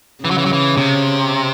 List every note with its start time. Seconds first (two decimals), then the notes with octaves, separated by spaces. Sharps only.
0.24 C#3 E3
0.31 F#3
0.38 E3
0.45 F#3
0.53 E3
0.77 C3